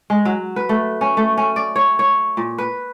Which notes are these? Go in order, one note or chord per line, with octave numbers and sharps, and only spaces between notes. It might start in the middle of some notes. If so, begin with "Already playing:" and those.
G#3
F#3
B4
A3
C#4
A3
C#4
D5
C#5
C#5
A#2
B4